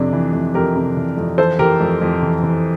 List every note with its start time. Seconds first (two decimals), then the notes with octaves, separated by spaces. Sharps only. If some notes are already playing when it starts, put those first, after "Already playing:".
Already playing: F2 C3 D4
0.13 E3
0.33 F2
0.54 F2 G4 A#4
0.76 C3
0.97 E3
1.17 F2
1.38 E3 A4 C5
1.59 E3 G4 A#4
1.80 F2
2.02 F2
2.22 E3
2.43 E3